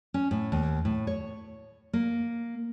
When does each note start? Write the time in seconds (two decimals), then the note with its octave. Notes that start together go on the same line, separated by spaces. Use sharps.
0.14 C#4
0.31 A2
0.52 D#2
0.85 A2
1.07 C#5
1.93 A#3